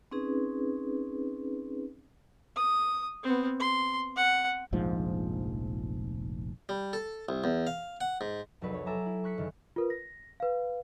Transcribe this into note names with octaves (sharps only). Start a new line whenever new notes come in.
C4 C#4 D#4 G#4 B4
D#6
B3 C4
C6
F#5
F1 A#1 G#2 F3
G3
A4
C2
E2
F5
F#5
G#2
F1 C2 F#3 B4
C#5
A4 E5 G#5 A#5 D6
E4
C#6 F#6 B6 C#7
F#1 D#3 E3
F4 A#4 B4
A#6
B4 F5